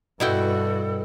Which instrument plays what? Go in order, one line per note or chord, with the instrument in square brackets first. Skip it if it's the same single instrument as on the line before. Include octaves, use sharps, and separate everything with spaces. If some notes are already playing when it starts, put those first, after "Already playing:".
[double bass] G2 [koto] B2 E4 G5 [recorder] F#4 [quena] A4